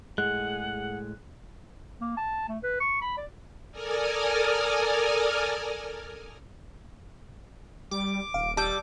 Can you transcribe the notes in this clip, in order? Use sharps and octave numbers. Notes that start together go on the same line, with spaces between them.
A2 G#3 G#4 F#5 F#6
A#3
A5
A3
B4
C#6
B5
D5
A4 A#4 D5 G#5 D#6 F6
G3 D6
D#1 F5
G3 A5 D6 E6 G6